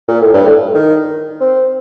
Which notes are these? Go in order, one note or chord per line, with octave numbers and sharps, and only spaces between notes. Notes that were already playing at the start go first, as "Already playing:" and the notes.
A#2
A2
G2
A2
D#3
C4